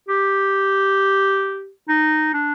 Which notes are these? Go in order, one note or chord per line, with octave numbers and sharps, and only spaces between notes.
G4
D#4
D4